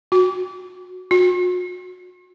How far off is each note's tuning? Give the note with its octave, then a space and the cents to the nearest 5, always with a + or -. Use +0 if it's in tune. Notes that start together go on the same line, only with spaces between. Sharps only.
F#4 -10
F#4 -45